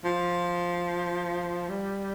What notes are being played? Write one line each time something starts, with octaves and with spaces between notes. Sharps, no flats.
F3
G3